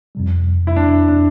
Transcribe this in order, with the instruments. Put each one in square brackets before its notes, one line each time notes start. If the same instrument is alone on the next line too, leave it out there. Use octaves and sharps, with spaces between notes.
[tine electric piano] F2 C3 G3
[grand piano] E4
D4
D4